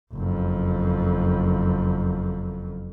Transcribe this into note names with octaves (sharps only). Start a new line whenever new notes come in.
F#1 F2